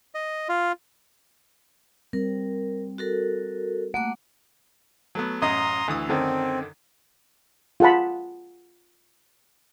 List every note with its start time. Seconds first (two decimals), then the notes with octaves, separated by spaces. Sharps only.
0.15 D#5
0.49 F4
2.13 G3 C4 A#4
2.98 F#4 A4 A#4
3.94 A3 A#3 F#5 D6
5.15 F#3 A3 B3
5.42 A1 F#2 D#5 A#5 C6 D#6
5.88 D2 E3 D#6
6.09 F#2 D3 D#3 C4
7.80 F4 G#4 F#5 A5 B5